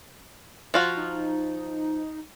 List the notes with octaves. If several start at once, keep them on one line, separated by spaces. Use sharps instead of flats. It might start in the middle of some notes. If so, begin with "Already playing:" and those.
F3 F4 F#4
D#4